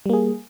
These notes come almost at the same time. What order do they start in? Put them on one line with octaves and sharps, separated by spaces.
G3 A#3 G#4